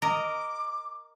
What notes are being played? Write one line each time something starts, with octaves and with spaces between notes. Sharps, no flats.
A#4 D#5 D6